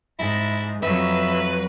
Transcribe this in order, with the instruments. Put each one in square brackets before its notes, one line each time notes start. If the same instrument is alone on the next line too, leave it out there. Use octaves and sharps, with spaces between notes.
[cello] G#2 [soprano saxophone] E4
[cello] F2 F#3 [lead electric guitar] B4 [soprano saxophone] E5